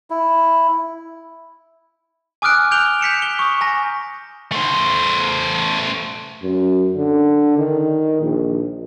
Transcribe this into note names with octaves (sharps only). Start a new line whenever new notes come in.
E4
G#5 D6 D#6 F6 F#6 D7
F#6 G6 D7 F7 G7
G6 B6 C#7 E7
G6 G7
C#6 D#6
G#5 A#5 C#6 A#6
A3 C5
F#2
D3
D#3
A#1